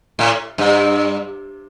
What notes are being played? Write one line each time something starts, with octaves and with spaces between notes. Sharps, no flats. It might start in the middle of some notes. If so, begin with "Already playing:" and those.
A2
G2